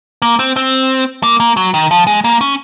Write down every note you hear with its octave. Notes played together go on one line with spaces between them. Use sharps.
A#3
C4
C4
A#3
A#3
F#3
D#3
F3
G#3
A#3
C#4